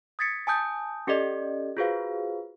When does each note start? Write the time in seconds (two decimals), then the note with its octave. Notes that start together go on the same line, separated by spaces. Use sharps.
0.19 D#6 G#6 A6 B6 C#7
0.47 G#5 A5 D#6 G6
1.07 C#4 G4 A4 D5 D#5
1.77 F4 F#4 G#4 B4 C5 F5